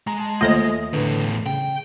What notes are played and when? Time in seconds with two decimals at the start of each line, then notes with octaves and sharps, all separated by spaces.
0.07 G#3 A#5
0.20 A5
0.41 D#2 A3 F4 A4 C5 D#5 E5
0.93 E2 A2 D3 B4
1.46 C#3 G5